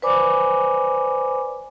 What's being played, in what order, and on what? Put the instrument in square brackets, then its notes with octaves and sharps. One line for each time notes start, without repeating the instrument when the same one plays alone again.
[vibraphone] B4 C5 D5 G#5 B5 D6